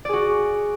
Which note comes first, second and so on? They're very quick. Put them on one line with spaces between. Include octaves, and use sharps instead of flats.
D5 G#4 F#4